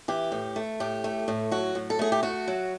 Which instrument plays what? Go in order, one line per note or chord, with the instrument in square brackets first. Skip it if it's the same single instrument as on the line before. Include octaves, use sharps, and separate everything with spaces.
[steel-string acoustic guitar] E3 G4
A2
A3
A2 G4
A3
A2
F#3 F#4
A2
A4
A3 G#4
G4
A3 F#4
F#3